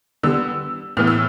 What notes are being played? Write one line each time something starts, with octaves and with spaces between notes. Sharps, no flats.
D3 G3 B3 E6
A2 E3 B3 F6
E6